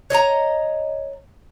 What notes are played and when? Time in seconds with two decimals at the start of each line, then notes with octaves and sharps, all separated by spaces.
0.10 C#5 D#5 G5 A#5